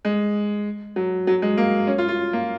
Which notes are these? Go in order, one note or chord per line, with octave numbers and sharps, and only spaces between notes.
G#3
F#3
F#3
G#3
A#3
C#4
F4
F4
A#3